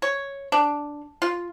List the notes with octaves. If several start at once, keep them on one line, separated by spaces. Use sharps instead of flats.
C#5
D4
F4